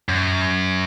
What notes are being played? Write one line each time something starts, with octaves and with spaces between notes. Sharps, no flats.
F#2